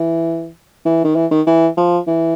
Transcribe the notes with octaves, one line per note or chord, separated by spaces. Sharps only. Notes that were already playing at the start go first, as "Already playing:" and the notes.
Already playing: E3
E3
D#3
E3
D#3
E3
F3
E3